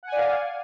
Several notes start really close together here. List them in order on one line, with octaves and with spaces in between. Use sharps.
F#5 G#5 D5 F5